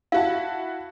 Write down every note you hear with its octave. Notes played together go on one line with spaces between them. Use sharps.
E4 F#4 F5 A5